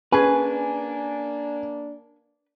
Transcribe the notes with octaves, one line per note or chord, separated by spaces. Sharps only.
A#3 C#4 D4 G#4 B4 G#5